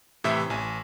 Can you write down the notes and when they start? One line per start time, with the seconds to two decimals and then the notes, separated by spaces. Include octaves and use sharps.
0.24 A2 C3 E3 E5
0.50 A1 G#5